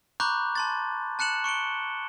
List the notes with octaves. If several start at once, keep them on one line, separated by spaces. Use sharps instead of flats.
A#5 B5 C#6 D6 F#6 G6
A5 C6 A6
A5 F#6 C#7 E7 F#7
C#6 C#7 D7 G7